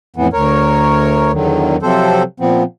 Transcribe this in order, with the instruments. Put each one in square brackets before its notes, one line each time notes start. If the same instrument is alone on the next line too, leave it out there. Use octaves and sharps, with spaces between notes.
[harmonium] F2 A2 E3 B3
D2 A#4 C#5
E2 D3 D#3 F#3
C3 F3 F#3 C4 A4 C5
A#2 F3 B3 C4